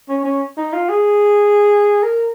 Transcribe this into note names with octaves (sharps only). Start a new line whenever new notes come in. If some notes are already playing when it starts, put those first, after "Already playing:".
C#4
C#4
D#4
F4
G#4
A#4